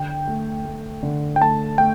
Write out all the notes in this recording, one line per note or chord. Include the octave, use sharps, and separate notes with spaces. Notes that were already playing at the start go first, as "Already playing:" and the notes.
Already playing: D3 G5
A3
A3
D3
G5
A3 A5
A3 G5